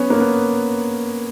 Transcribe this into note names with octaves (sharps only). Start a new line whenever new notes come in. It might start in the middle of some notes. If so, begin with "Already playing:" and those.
Already playing: B3 C#4
A#3
B3